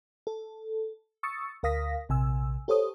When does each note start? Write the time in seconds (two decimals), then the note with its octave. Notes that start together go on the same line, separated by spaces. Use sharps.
0.27 A4
1.23 C#6 D#6 E6 A6 C#7
1.63 D2 A#4 F5 D#6 A#6 B6
2.09 A#1 C3 G#5 E6
2.68 G4 A4 C5 C#5 D#6